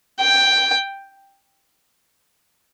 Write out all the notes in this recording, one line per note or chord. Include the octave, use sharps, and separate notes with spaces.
G5